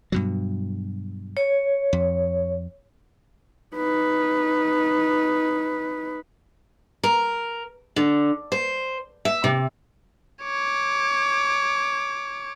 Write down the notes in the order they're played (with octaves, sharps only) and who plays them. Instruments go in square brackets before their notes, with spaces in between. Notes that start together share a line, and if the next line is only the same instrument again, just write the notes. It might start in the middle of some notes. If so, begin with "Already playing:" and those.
[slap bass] G2 B2 F#3
[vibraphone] C#5
[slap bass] F2
[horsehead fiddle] D#4 B4
[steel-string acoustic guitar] A#4
D3
C5
E5
C3
[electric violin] C#5 D6